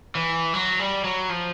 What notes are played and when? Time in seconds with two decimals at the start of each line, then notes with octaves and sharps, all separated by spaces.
0.15 E3
0.54 F#3
0.79 G3
1.04 F#3
1.29 F3